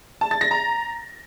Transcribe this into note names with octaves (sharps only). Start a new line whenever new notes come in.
A5
A6
A#6
A#5